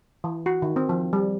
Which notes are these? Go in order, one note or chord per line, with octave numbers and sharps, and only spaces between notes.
E3
F#4
D#3
C4
F3
G3